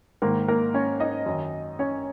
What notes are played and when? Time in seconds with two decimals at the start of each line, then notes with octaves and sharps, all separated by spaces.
0.22 G#2 D#3 A#3 A#4
0.48 A#3 A#4
0.74 C#4 C#5
1.00 D#4 D#5
1.26 F#2 D#3
1.79 C#4 C#5